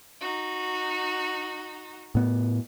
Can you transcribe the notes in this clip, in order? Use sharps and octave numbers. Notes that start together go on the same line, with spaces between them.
D#4 F#4
A2 B3